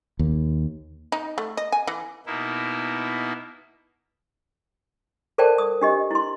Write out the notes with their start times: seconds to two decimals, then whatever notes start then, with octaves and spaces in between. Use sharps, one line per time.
0.19 D#2
1.12 D#4
1.38 A3
1.57 D#5
1.72 G#5
1.87 E3
2.26 B2 A#3 D#4 E4
5.38 A4 A#4 C5 D5 G5 A5
5.58 D#6
5.81 D4 G4 D#5
6.11 E4 C6